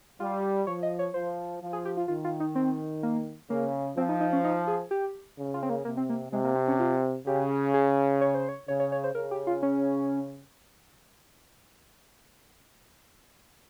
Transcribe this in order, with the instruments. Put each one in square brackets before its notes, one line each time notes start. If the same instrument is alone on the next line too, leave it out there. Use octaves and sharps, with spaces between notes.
[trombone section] G3 [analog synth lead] F4
[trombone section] F3 [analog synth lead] C#5
[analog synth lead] D#5
C#5
[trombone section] F3 [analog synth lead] C5
[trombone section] F3
[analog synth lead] G#4
G4
F4
[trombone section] D#3 [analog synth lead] F4
[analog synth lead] F4
D#4
C4
A#3
[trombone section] C#3 [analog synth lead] A#3
[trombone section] F3 [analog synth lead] C4
[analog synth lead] D#4
D#4
C#4
D#4
G#4
G4
[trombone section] C#3
[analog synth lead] F4
C4
A#3
[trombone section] C3 [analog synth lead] A#3
[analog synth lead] C4
A#3
[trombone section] C3 [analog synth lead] G#3
[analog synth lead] A#3
C4
C#4
F4
[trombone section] C#3 [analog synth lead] G4
[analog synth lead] G#4
C#5
C5
C#5
[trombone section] C#3 [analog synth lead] C#5
[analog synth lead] C#5
C#5
C5
[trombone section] C#3 [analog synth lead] A#4
[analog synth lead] G4
F4
C#4